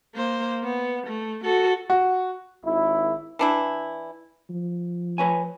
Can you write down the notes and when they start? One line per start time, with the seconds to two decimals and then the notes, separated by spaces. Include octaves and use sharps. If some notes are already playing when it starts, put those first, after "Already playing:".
0.15 A#3 C5
0.64 B3
1.08 A3
1.44 F#4 A4
1.90 F#4
2.65 G#1 E4
3.39 E3 D4 E4
4.50 F3
5.18 B4 C#5 G#5